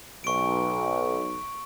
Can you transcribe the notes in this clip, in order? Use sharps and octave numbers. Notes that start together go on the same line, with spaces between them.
B1 C#6 D7